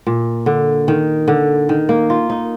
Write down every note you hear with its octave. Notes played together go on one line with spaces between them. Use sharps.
A#2
D3
D#3
D3
D#3
A#3
F4
D#4